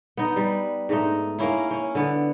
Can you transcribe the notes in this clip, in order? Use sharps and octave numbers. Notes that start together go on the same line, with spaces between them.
B3 D#4
G3
G#2 A3 D#4
A#3 C#4 E4
C#4
D3 B3